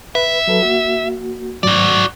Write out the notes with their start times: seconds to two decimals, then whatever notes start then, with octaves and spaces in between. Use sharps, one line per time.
0.15 B4 E5
0.47 F#3 A4 B4
0.62 A#3 F#4
1.63 G#2 F#3 F#4 D5